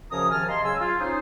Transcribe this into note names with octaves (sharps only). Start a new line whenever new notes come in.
F#2 C#3 F3 C#4 A#5 D#6
C3 D#3 F3 G#5 A5 F6
D#5 F5 A5 A#5 C6
C#3 F#3 G#5 E6
F4
C#4 D#4 G#4 C5